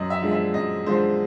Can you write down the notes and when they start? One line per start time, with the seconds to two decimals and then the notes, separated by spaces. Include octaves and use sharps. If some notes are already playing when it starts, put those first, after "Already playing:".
Already playing: F#2 D#5
0.10 E5
0.21 D3 F3 G#3
0.32 E5
0.53 F#2 D#5
0.86 D3 F3 G#3 C5